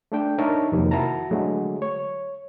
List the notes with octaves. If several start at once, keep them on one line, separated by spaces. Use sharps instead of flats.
A3 D4 G5
D4 D#4 A#4 C#5 E5 A5
F2 C3 D#3 F#3 A#3
E4 F#4 A#4 A5 A#5
D3 F#3 G#3 A3
C#5